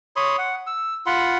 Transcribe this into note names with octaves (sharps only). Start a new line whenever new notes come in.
C#5 B5 C6 D#6
F#5
E6
F4 F#5 B5 C6